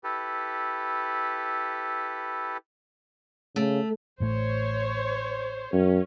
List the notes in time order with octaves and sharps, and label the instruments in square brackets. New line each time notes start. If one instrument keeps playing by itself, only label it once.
[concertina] E4 G4 A4 B4
[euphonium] C#3 [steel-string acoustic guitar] A3
[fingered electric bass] A1 A2 A3 [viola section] C5 C#5
[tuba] F#2 [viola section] C#4